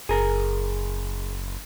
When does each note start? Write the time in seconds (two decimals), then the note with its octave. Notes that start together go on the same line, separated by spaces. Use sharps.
0.09 F#1 G#4 A#4